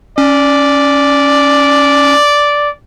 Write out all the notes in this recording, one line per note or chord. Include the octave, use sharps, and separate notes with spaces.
C#4 D5